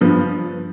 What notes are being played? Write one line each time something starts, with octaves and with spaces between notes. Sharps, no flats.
G2 F3 B3